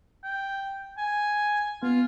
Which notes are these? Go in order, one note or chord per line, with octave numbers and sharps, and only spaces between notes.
G5
G#5
B3 F4